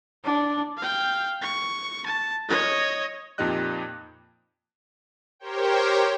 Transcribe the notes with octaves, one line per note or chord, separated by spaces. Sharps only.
D4
F5 G5
C#6
A5
C#5 D#5
F2 A#2 D#4 G4 D#5 F#6
G4 A#4 C5 C#5 G5